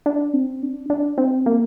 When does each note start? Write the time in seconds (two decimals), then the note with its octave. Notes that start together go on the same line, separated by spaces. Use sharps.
0.06 D4
0.33 C4
0.63 D4
0.90 D4
1.18 C4
1.46 A#3